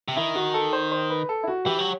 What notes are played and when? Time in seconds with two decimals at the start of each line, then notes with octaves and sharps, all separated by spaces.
0.08 C3
0.17 D#3 E4
0.35 F#4
0.54 A4
0.73 C5
0.92 C5
1.10 B4
1.29 A4
1.43 E4
1.48 F#4
1.66 E3 G4
1.79 F#3